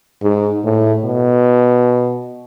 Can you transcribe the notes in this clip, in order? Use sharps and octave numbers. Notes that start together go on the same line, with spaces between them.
G#2
A2
B2